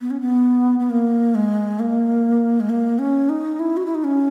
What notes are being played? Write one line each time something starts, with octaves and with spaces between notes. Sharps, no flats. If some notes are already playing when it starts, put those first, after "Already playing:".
B3
C#4
B3
B3
A#3
G#3
A#3
G#3
A#3
C#4
D#4
E4
F#4
E4
D#4
C#4